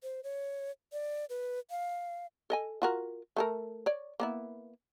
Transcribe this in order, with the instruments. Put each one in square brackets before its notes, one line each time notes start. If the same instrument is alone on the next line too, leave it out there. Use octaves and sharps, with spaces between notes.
[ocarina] C5
C#5
D5
B4
F5
[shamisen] A4 D#5 G#5
F4 F#4 A#4
A3 A4 A#4
C#5 D5
A#3 B3 E4